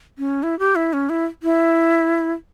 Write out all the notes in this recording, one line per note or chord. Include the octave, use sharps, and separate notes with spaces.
C#4
E4
G4
E4
C#4
E4
E4